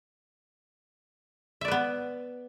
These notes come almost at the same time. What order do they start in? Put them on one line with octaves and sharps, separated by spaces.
E5 D5 B4 B3